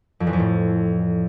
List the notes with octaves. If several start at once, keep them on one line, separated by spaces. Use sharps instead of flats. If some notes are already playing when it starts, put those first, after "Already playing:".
F2
E2
F2
A2